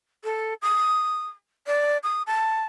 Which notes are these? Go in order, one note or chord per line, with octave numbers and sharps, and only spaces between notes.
A4
D#6
D5
D#6
A5